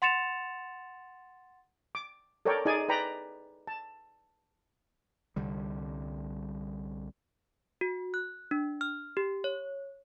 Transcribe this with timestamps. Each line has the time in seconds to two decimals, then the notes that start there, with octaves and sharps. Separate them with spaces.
0.02 F#5 C6 A6 C#7 E7 F7
1.95 D6
2.45 A4 A#4 C#5 D5 G5
2.65 D#4 G#4 D5 G#5
2.89 B4 D5 G5 A#5 B5
3.67 A5
5.36 C2 D3 G3
7.81 F#4
8.14 F#6
8.51 D4
8.81 F6
9.17 G4
9.44 C#5